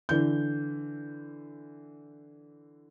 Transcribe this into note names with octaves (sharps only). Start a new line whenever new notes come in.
D3 E3 G6